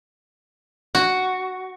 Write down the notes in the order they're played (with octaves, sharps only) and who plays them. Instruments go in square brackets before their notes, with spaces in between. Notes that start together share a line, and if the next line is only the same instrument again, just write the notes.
[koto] F#4